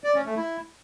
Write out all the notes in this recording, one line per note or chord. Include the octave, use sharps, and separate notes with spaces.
D5
C#4
A3
E4